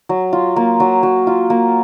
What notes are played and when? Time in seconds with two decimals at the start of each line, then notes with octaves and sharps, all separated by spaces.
0.09 F#3
0.33 F4
0.56 A#3
0.80 F#3
1.03 F#3
1.27 F4
1.50 A#3